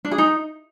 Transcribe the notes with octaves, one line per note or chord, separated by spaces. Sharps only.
D4
G#4
D#4